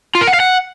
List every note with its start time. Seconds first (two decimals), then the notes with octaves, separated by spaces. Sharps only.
0.15 F4
0.21 A#4
0.27 F#5
0.34 F5
0.40 F#5